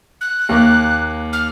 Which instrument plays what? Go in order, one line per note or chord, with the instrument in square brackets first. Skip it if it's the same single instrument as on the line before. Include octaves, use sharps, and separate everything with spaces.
[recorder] F#6
[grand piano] D#2 A#3
[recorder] F6